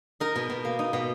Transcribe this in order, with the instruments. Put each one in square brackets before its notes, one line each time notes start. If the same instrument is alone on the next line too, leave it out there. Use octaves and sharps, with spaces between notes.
[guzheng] D#4 A#4
B2
B2
A#3
D#4
B2